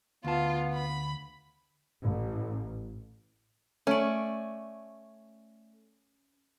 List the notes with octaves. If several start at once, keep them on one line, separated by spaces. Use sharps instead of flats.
D2 B3 F4 A5
B5
A1
A3 C#4 D5